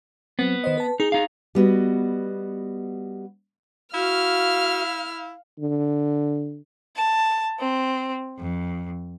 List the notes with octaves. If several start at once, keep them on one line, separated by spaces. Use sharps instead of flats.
F#3 B3 C4
D#3 C5 D#5
B4 A5
D#4 G#4
D#4 F5
G3 B3 F#4 D#5
E4 F#4 F5 F6
D3
A5
C4
F2